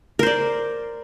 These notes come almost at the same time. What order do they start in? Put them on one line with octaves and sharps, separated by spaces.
A#4 C5 D5